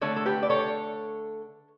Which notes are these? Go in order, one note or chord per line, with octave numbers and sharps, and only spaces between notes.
D3 A3 A4 C#5
A4
G4 B4
D5
A4 C#5